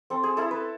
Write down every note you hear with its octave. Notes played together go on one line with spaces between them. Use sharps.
C4 A4
G#4
E4 A4
B4